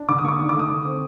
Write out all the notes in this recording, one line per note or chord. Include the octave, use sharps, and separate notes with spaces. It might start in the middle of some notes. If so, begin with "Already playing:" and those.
Already playing: D4
D3 D6
D#6
A#3 C#6 D6
D#3 C#6
D6
A3
D#6
D3
C4